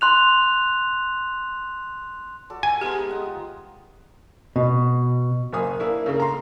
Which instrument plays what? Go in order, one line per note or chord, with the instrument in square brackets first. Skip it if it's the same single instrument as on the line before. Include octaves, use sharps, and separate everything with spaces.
[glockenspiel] C6 F#6 F7
[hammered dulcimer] F#4 A4 D5
[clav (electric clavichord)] G#5
[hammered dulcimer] G#3 B3 D#4 [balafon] G4
[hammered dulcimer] D#5 F#5 G5
F4
[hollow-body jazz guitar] B2
[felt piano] F#1 A#3 G#5 D#6
A#3 D4 E4
C#3 A3 A#3
A#5 C6